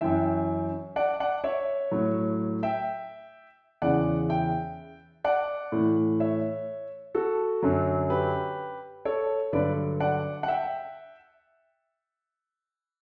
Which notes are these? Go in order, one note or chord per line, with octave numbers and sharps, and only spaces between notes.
F#2 E3 E5 G5
D5 F#5
D5 F#5
C#5 E5
A2 F#3
E5 G5
E2 C#3 E3 D5 F#5
E5 G5
D5 F#5
A2 E3
C#5 E5
F#4 A4
F#2 D3 F#3
G4 B4
A4 C#5
G2 D3 F#3 B4 D5
D5 F#5
F#5
E5 G5